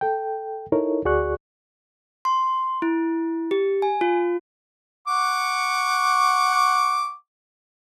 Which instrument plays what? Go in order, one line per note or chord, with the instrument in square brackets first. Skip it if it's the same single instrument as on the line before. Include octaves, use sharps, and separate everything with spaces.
[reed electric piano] A4 G5
D#4 E4 A4 A#4 C#5
D2 F#4 G#4 D5 C#6 F#6
[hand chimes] C6
E4
G4
G#5
F4
[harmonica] F#5 C#6 D6